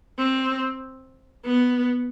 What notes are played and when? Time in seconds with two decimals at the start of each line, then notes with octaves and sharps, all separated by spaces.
0.19 C4
1.46 B3